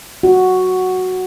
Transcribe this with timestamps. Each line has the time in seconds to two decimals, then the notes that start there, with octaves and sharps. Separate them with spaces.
0.23 F#4